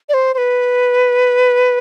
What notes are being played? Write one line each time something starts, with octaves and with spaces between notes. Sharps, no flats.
D5
C5
C5
B4